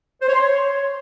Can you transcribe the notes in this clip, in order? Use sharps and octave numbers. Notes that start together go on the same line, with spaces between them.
C5
C#5
C6
C#5